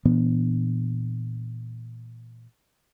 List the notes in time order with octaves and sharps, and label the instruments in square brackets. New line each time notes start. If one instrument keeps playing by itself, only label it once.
[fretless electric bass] A#2 E3 B3 D4